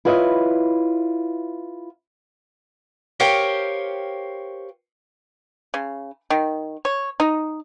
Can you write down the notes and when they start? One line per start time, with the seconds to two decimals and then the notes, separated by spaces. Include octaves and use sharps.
0.05 E4 F4 B4 C#5 D#5 E5
3.20 G4 A#4 C5 C#5 F5 G5
5.74 C#3
6.30 D#3
6.85 C#5
7.20 D#4